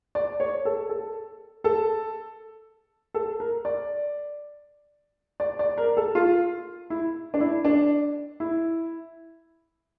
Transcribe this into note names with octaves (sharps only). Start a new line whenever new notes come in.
D5
C#5
A4
A4
A4
A4
A#4
D5
D5
D5
A#4
A4
F4
E4
D4
E4
D4
E4